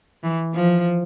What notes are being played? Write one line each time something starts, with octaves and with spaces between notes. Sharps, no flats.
E3
F3